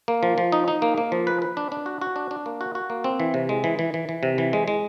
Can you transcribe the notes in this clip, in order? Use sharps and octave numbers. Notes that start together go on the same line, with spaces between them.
A#3
F3
F3
D#4
D#4
A#3
A#3
F3
B4
B4
D4
D4
F#4
F#4
D4
D4
A#3
F#4
F#4
A#3
C4
E3
C3
G#3
E3
E3
E3
E3
C3
E3
G#3
G#3